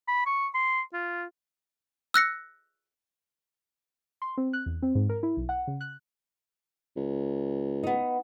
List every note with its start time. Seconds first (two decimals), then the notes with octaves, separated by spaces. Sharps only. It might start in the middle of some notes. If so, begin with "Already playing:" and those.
0.08 B5
0.26 C#6
0.54 C6
0.93 F4
2.14 E6 F#6 A#6 C#7
4.22 C6
4.38 C4
4.53 F#6
4.66 E2
4.83 C4
4.95 G#2
5.09 A#4
5.23 E4
5.37 B1
5.49 F#5
5.67 C#3
5.81 F#6
6.97 C#2
7.83 B3 D#4